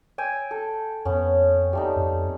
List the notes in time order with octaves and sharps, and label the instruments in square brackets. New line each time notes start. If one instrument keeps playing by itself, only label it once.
[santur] G5 G#5 E6
A4
[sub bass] F2 [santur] B3 C#4
[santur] G3 A3 D#4
[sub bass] F2